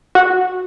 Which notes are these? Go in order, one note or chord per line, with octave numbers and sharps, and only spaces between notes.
F#4